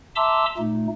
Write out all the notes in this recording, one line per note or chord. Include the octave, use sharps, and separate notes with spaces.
E5 A5 A#5 C6 D6 E6
A#2 A3 D#4